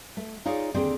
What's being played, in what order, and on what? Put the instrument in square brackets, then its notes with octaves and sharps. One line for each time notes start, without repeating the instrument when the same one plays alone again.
[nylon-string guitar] A3
D#4 F4 G#4 C#5 D5
D#2 D3 C4 G4 G#4 D5